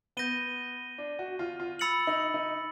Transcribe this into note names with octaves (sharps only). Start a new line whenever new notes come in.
B3 G6 A#6 D#7 G7
D4
F#4
F4
F4
B5 E6 A6 C#7 F#7
D#4
D#4